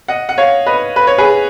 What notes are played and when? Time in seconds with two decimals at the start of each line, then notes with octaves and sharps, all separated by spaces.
0.08 D#5 F#5
0.29 F#5
0.38 C#5 F5
0.66 B4 D#5
0.96 B4
1.07 C#5
1.18 G#4 B4